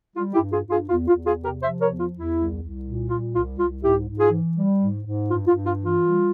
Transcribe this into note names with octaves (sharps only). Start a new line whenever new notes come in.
G3 F4
E4 G4
G2
F4 G#4
G2
F4 G#4
E2 F4
F4
E2
F4 G#4
C3
G4 A#4
F3 C5 E5
A#4 C#5
E2
F4
E2
E4
C2
C2
A#2
G3 F4
C2 F4
C2 F4
G#2 E4 G4
G#2
F4 G#4
E3
G3
G#2
G#2
G2 F4
F4
G2
F4
E3
F4
G3